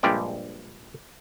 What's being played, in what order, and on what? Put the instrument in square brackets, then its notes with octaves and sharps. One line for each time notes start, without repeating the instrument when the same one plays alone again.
[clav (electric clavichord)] A#1 G2 G3 G#3 D5